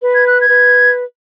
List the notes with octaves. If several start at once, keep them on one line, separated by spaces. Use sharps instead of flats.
B4
G#6
F#6
G#6
B4